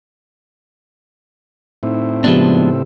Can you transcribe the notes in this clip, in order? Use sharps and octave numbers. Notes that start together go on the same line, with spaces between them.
A2 C4 D#4 E4
C#3 F3 G#3 B3 D4 G4 B4